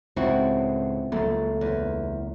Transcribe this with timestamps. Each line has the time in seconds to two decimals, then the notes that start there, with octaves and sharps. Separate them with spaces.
0.16 C#2 A2 C4 E4 F#4
1.12 C#2 F#3 A3 A#3
1.61 E2